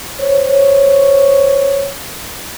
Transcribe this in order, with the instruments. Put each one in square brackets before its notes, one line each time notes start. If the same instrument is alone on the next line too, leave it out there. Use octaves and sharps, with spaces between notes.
[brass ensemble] C5 C#5